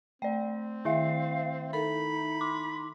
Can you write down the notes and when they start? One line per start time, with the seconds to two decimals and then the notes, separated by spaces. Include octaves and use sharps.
0.22 A3 C4 D5 G5
0.85 D#3 E4 E5 F5
1.73 D#4 A4 A#4 B5
2.41 C6 D6